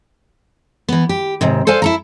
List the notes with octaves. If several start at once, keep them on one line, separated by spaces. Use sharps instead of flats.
E3 B3
G4
D#2 G#2 C3
A4 C5 D5 F5 G#5
E4 A4 A#5